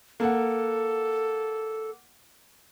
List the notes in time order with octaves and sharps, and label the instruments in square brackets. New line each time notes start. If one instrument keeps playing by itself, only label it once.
[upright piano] A#3 F#5 [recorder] A4